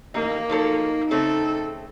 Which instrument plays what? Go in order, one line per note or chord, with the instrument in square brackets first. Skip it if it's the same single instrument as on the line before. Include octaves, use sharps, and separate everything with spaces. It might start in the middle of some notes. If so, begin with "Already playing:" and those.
[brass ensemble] A1 D#2 [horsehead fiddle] A#3 [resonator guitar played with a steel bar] D#4
[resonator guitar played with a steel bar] F3 F#3 A4 [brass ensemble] D#4
[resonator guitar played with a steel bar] C#3 A3 C4 [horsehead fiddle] A4